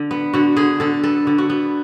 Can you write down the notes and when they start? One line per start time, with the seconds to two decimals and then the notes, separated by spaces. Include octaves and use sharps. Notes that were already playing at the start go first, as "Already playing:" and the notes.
Already playing: D3
0.11 B3
0.33 D3 F#4
0.56 D3 G#4
0.80 D3 A4
1.04 B3 A4
1.27 D3
1.38 F#4
1.50 B3